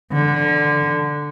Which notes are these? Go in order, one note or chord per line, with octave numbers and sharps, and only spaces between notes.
D3